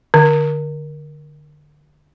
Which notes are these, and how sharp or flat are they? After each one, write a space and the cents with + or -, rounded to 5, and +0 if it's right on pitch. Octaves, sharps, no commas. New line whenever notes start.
D3 +15